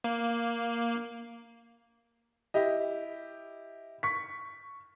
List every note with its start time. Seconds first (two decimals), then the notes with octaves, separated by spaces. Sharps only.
0.04 A#3
2.54 E4 G4 D#5
4.03 C#6 B6